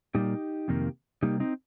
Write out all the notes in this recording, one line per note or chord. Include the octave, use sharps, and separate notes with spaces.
A#2 G3 A#3 D#4 G4
F2 C3 D#3 A#3
C3 G3 A#3 D#4 G4
C4 D#4